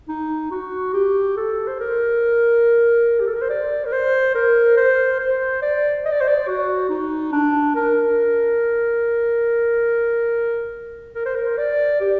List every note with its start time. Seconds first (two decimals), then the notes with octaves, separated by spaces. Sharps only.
0.08 D#4
0.51 F#4
0.93 G4
1.37 A4
1.67 C5
1.80 A#4
3.20 G4
3.27 A4
3.34 A#4
3.42 C5
3.49 D5
3.85 A#4
3.92 C5
4.35 A#4
4.77 C5
5.19 C5
5.62 D5
6.05 D#5
6.12 D5
6.20 C5
6.28 D5
6.47 F#4
6.89 D#4
7.32 D4
7.75 A#4
11.15 A#4
11.25 C5
11.35 A#4
11.58 D5
12.00 G4